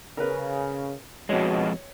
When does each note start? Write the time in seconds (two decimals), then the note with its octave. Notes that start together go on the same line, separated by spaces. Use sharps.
0.17 C#3 A#4 B4
1.29 F2 B2 G#3 F#4 C#5